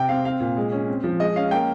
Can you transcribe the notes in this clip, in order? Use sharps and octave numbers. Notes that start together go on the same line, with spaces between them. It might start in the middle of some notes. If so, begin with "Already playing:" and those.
Already playing: C3 G5
C4 F5
C4 F5
A#2
G#3
C#4
C4
F3
G#3 D#5
C#4 F5
A#3 G5